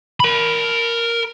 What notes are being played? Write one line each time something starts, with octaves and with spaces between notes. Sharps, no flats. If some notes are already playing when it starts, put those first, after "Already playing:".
A#4 B5